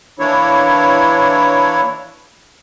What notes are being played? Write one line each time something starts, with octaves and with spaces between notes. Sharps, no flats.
E3 A#3 D4 E4 C#5